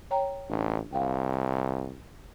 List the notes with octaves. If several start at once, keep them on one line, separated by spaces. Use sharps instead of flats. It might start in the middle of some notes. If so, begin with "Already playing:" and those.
C#5 G5 A#5
A1 D4
C2 F5 G5